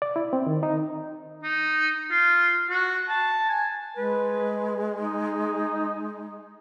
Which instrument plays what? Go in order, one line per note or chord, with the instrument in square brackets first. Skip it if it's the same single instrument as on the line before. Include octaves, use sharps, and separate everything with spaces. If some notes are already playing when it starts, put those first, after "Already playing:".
[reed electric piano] D5
E4
C4
D#3
D#4
[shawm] D#4
F4
F#4
A5
G#5
[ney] G#3 [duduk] B4
[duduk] D#4